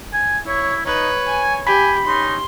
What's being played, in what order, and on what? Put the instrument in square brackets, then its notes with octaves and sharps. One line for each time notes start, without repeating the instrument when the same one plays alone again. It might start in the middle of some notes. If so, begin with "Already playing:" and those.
[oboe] G#5
[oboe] E4 [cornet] C#5
[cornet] D#4 [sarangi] B4 [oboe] C#5
[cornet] G#5
[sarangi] G4 [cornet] G#5 [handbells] B5 B6
[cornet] C#4 [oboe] D#4 [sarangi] C6